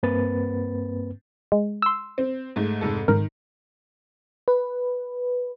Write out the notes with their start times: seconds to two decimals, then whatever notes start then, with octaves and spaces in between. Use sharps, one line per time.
0.03 G2 A#3 C4 B4 A6
1.52 G#3
1.82 C6 E6
2.18 C4
2.56 G#2 A3
2.81 F1 G#2 A4
3.08 G#2 D#3 A#4
4.48 B4